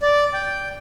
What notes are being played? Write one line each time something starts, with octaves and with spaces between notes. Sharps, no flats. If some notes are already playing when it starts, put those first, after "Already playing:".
D5
G5